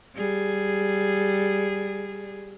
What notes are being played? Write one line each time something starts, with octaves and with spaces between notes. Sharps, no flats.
G3 G#4